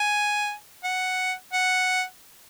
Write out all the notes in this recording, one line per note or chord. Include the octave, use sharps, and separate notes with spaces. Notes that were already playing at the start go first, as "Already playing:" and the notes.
Already playing: G#5
F#5
F#5